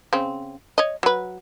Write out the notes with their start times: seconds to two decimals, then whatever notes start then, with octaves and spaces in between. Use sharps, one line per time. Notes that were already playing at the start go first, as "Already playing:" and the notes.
0.13 C#3 C4
0.78 C#5 D#5
1.03 F#3 B4